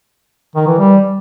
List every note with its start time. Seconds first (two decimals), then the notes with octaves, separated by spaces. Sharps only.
0.56 D#3
0.67 E3
0.78 G3